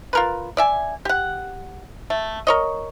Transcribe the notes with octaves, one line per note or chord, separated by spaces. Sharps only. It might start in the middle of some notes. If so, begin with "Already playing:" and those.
F4 A#4 B4
D5 E5 G#5
G4 F#5
A3
A#4 C#5 D#5